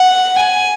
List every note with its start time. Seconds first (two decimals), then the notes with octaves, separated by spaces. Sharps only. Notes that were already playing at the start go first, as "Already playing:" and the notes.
Already playing: F#5
0.39 G#5